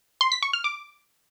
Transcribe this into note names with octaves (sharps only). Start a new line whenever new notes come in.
C6
B6
C#6
F6
D6